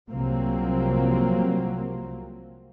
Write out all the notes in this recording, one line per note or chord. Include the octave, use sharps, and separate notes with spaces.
C2 C3 F3 F#3 A#3 C4